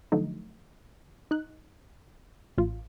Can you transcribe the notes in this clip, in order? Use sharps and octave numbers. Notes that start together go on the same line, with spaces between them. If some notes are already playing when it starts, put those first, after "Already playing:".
D3 F3 F#3 A3 D#4
D#4 F#6
A1 F4